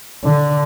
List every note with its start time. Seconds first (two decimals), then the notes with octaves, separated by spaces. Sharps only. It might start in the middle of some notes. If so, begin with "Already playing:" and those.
0.24 D3